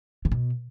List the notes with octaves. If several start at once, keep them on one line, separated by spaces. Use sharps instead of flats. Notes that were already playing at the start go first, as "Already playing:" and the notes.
C#3
B2